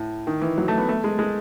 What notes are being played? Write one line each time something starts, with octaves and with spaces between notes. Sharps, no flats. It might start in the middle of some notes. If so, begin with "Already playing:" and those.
Already playing: A2
D#3
E3
F#3
A3
B3
A3
G#3
G#3